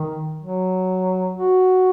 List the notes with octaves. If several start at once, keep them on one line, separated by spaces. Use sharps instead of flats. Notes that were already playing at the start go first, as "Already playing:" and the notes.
Already playing: D#3
F#3
F#4